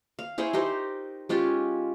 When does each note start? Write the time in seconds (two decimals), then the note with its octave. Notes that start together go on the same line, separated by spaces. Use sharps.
0.19 F5
0.38 E4 G#4 C5 C#5
0.53 D#4 G4 A#4 C5
1.29 G#3 C#4 F4 G4